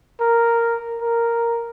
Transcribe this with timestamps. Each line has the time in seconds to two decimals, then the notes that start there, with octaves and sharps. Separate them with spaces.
0.21 A#4
1.02 A#4